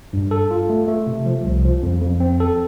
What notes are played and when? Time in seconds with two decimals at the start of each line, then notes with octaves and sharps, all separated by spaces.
0.13 G2
0.31 A4
0.51 F4
0.70 A3
0.88 A3
1.07 C3
1.26 F3
1.45 C2
1.65 F3
1.83 F2
2.01 F2
2.20 C4
2.40 A4